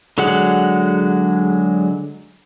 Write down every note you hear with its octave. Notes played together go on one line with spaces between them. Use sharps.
D3 F#3 G#3 G#4 F#5